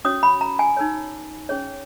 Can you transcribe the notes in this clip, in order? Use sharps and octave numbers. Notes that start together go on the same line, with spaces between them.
C#4 F#4 C#5 D#6
B5
A#5
G#5
D#4 A#4 C#5
C#4 G#4 C#5